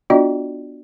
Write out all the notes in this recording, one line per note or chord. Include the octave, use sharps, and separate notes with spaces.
B3 D4 F4 F#4 D5 D#5